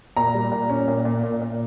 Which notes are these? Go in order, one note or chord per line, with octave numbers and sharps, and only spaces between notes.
A#2 A#5
G3
A#2
C#4
A#2
A#2
A#2
A#2